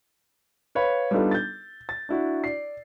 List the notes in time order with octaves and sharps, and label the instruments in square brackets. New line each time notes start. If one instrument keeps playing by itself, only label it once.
[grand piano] B4 C#5 F5 B5
G3 B3 D4 D#4 F4 A4
G6 A6
A6
D4 E4 F#4
D5 C7